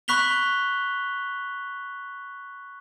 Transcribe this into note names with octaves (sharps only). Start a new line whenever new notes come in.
B5 C#6 F#6 B6 F7 G7